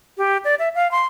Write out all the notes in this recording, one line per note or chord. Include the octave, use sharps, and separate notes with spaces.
G4
D5
E5
F5
C6